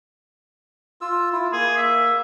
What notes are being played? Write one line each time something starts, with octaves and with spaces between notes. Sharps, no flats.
F4 E6
E4 F4
A#3 G#4
E5